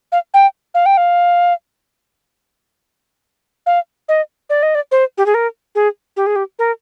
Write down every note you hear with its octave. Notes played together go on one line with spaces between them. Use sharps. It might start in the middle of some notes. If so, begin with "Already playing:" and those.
F5
G5
F5
G5
F5
F5
D#5
D5
D#5
D5
C5
G4
G#4
A#4
G#4
G4
G#4
G4
A#4